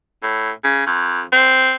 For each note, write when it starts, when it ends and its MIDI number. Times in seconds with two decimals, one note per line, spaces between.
0.23 0.50 45
0.64 0.83 49
0.86 1.21 41
1.32 1.75 60